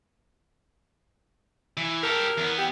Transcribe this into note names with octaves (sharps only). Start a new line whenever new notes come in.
E3
G4 A4 A#4
E2 B3
G4